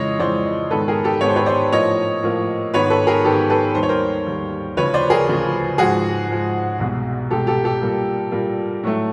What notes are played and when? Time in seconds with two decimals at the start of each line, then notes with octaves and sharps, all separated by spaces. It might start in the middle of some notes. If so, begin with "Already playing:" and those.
Already playing: F2 C#3 E3 G#3 C#5 D#5
0.19 F2 C#3 E3 G#3 C5 D5
0.70 G#2 D#3 G#3 B3 A4 B4
0.88 G#4 A#4
1.04 G4 A4
1.21 G#2 D#3 G#3 B3 C#5
1.28 C5
1.36 B4 C#5
1.46 C5 D5
1.72 A2 F3 A#3 C#5 D#5
2.23 A2 F3 A#3
2.74 G#2 D#3 G#3 B3 B4 C#5
2.90 A4 B4
3.07 G#4 A#4
3.24 G#2 D#3 G#3 B3 G4 A4
3.50 A4 B4
3.75 D#2 D#3 G3 C5
3.83 C#5
3.89 A#4 C5
4.26 D#2 D#3 G3
4.77 D2 C#3 F3 B4 C#5
4.94 C5 D5
5.10 G#4 A#4
5.28 D2 C#3 F3
5.78 G#2 F3 G#3 F#4 G#4
6.28 G#2 F3 G#3
6.79 C2 B2 G#3
7.31 C2 B2 G#3 G4 A4
7.47 G4 A4
7.64 G4 A4
7.82 A#2 G3 A#3
8.32 A#2 G3 A#3
8.84 A2 F#3 A3